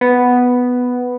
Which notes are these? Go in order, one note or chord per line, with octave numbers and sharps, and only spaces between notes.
B3